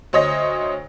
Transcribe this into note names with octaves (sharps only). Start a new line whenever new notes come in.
D2 C5 C#5 D#5 A#6